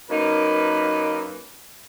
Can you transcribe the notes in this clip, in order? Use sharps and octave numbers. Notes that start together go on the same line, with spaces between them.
F#2 A#3 D#4 B4